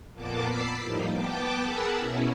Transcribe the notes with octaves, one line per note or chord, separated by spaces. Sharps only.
F2 A#2 A#3 B3 A5 D6
B5 D6 E6 A6 B6 C7
A2 F3 G3 A#3 D#4
B3 G5 A5 D6
G#4 A#4 F#5 A5 B5 E6
B2 C#4 E4